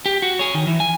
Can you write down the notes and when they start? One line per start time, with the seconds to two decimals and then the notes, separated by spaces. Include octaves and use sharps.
0.06 G4
0.22 F#4
0.39 G#4 C#5
0.54 D#3
0.67 E3
0.80 G#5